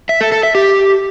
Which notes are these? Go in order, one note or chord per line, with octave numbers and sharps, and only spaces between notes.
E5
A4
A4
E5
G4